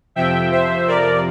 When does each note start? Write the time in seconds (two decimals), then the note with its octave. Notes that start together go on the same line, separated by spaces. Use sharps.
0.16 F2 C3 F3 E5 G5
0.51 C5 E5
0.88 A#4 D5